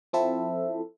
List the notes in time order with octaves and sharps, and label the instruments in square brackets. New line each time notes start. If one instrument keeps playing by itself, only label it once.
[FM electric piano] F3 C4 E4 A4 C5 E5